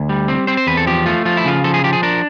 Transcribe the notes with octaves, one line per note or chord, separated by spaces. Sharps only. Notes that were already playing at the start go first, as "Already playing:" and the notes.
Already playing: D2
G3
C4
C4 C5
C5
E2 B4
A4
F3 G4
A3 F4
F3 F4
E4
C#3 F4
F3 A4
G#4
F3 G4
G#4
D4 A#4